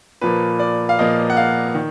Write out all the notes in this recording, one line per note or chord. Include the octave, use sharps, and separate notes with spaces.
A#2 F3 A#3 B4
D5
F5
A#2 F3 A#3 D#5
F#5
F5
D#3